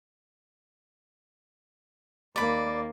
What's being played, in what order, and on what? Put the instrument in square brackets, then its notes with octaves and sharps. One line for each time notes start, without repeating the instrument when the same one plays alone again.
[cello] D#2 A#3 [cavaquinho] D5 B5